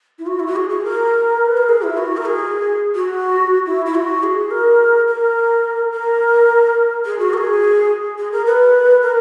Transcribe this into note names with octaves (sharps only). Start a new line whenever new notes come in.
E4
F#4
E4
F#4
G#4
G#4
A#4
B4
A#4
G#4
E4
F#4
A#4
G#4
F#4
E4
E4
F#4
G#4
A#4
A#4
A#4
G#4
F#4
A#4
G#4
G#4
A#4
B4
A#4